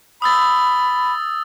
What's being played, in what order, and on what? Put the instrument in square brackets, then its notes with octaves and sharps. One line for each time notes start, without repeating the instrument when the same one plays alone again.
[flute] B5 [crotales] D#6 E6 A6